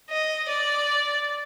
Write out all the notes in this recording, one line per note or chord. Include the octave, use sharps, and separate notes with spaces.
D#5
D5